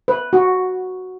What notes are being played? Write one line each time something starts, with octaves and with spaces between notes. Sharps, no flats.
B4
F#4